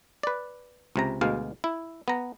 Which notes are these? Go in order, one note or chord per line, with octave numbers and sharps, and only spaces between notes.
B4 D5
C#2 C3 A#5
D2 B2 G#3 F5
E4
B3 A#5